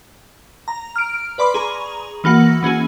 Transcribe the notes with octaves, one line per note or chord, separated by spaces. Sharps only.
A#5
F6 D7
B4 D5 B5 C6 D6
G#4 A#5 C#6
E3 A#3 F#4 F#5 C#7
E3 C#4 F#4 G#4